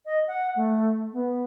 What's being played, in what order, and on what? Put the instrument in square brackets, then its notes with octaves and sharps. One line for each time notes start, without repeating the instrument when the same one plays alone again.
[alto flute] D#5
F#5
A3
B3